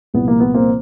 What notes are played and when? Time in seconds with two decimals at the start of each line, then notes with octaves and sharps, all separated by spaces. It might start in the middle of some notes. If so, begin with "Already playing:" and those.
0.14 C2 A#2 F3 B3
0.28 A#3
0.40 B3
0.54 A#3 C4